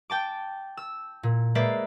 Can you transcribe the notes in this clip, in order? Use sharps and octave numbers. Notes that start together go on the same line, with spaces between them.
G5 A5 D6
E6
A#2
G#3 A#3 B4 C5 D5 E5